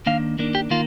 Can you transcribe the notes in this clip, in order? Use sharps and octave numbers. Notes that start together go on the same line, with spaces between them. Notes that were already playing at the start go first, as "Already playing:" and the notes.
D#3 A#3 D4 F5
D#3 A#3 D4
G4
D#3 A#3 F4